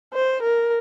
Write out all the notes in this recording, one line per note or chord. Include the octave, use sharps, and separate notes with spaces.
C5
A#4